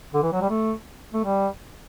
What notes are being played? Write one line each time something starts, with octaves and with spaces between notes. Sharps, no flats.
D3
E3
F#3
G3
A3
A3
G3